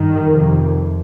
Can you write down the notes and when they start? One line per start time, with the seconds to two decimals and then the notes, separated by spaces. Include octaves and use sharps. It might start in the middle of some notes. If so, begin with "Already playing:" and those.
Already playing: G2 D#3
0.30 F2 C3